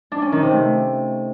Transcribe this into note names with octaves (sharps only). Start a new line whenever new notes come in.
D4
C#4
D#3
C3
A3